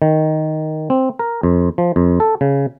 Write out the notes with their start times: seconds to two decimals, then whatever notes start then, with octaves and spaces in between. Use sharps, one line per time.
0.02 D#3
0.90 C4
1.19 A#4
1.43 F2
1.78 F3
1.96 F2
2.20 A4
2.41 C#3